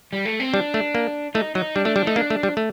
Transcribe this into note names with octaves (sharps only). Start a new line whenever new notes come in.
G3
A3
C4
G3 D4
A3
A#3
A3 D#4
F#3 D#4
G3 D4
A3 D4
G3 D4
A3 D#4
A#3 D4
A3
G3
A3